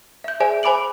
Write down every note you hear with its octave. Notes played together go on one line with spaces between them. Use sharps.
E5 G6
G#4 C5 D5 E5 G#5
C5 G#5 B5 D6 D7 F#7